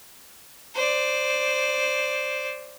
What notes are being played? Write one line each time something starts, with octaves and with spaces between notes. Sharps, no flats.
C5 D5